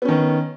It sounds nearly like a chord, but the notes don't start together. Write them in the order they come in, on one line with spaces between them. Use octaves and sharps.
B3 C#4 D#3